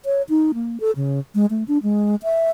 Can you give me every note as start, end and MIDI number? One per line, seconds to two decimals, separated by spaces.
0.05 0.22 73
0.29 0.52 63
0.54 0.78 58
0.80 0.91 69
0.96 1.20 49
1.35 1.46 56
1.50 1.64 57
1.68 1.78 62
1.83 2.15 56
2.23 2.50 76